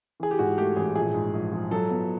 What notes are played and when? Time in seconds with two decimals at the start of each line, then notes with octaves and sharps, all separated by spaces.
0.20 E3 G#4
0.31 G4
0.39 G#2 F#4
0.57 A3 G4
0.76 A1 G#4
0.96 A#1 G#4
1.14 G#2
1.34 A#1
1.52 F3
1.71 F#3 A4
1.90 B3